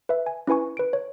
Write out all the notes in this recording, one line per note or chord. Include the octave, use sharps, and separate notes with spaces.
B4 E5
G#5
C#4 E4 B4 G#5 C#6
B4 D7
C#5